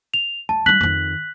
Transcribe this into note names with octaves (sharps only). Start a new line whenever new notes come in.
F7
D2 A5
G3 D#4 F#6 B6 F#7
F2 D#3